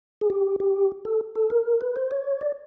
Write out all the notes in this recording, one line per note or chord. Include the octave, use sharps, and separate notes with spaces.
G#4
G4
G4
A4
A4
A#4
B4
C5
C#5
D5